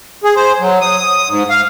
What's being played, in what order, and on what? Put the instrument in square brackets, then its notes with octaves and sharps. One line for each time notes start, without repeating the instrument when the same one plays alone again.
[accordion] G#4
C5
F#3
D#6
G#2
F5